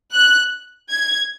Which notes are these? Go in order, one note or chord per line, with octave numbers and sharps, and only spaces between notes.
F#6
G#6